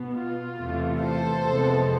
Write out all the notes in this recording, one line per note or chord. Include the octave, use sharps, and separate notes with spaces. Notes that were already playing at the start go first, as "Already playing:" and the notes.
Already playing: B2 B3
F4
E2 C3 E3 A3
A4 C5
F2 C3 G#3 B3